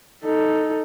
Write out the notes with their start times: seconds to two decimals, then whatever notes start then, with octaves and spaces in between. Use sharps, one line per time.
0.24 D#4 A4